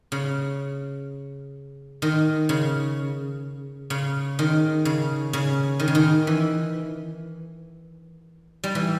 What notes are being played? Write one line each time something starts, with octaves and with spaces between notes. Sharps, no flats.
C#3
D#3
C#3
C#3
D#3
C#3
C#3
D#3
C#3
D#3
E3
G3
E3